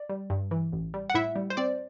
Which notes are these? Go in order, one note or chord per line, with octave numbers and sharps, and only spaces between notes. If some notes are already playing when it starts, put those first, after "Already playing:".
Already playing: D5
G3
G2
E3
A1
G3
F#5
A2 E4 E5
G3
C5
C4 D5